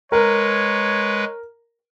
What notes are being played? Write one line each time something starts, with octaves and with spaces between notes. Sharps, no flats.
G#3 A#4 B4 C#5